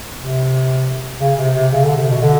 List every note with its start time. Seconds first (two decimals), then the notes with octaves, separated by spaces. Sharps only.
0.19 C3
1.20 C#3
1.38 C3
1.54 C3
1.71 C#3
1.84 D3
1.97 C3
2.10 B2
2.22 D3